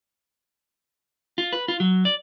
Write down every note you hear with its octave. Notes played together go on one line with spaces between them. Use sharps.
F4
B4
F4
F#3
D5